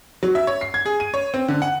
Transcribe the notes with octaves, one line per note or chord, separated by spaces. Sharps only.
F#3
E5
C#5
C7
G#6
G#4
D#7
C#5
C4
D3
F#5